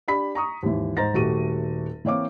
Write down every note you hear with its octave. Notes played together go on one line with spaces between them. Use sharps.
D4 G4 B5 B6
A#5 C#6 D#6
D#2 G#2 E3
G#2 C5 D#5 A#5 A6 A#6
D#1 A3 F#4 G4 D#7
E3 A#3 C4 C#5 F5 D6